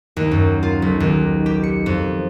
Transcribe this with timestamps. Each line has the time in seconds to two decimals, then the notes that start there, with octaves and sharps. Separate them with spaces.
0.17 D#2
0.31 F#2
0.63 F4
0.82 B1
1.00 D#2
1.46 G4
1.63 C#7
1.86 F2